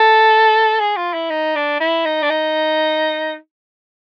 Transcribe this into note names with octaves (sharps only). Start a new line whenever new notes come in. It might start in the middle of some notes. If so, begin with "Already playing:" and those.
Already playing: A4
G#4
F4
E4
D#4
D4
E4
D#4
D4
D#4